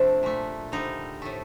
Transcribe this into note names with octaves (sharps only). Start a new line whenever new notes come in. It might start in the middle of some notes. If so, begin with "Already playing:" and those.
Already playing: C3 F3 A3 D4
A#2 A3
D3 G3 D#4
A2 A3